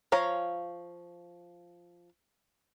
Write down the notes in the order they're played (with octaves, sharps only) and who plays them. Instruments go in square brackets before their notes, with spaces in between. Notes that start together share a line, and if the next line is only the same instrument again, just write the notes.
[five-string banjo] F3 C#5 F5 A#5